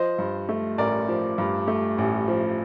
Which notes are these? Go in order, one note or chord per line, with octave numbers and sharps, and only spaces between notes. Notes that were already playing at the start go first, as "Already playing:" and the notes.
Already playing: F3 C5 D#5
G2
A3
A1 A#4 D5
F3
G2
A3
A1
F3